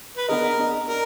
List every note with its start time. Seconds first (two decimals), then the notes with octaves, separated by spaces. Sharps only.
0.17 B4
0.29 B3 D4 G#4 A#4 D#5
0.58 B3 D4 G#4 D#5
0.88 F#4 A#4 D5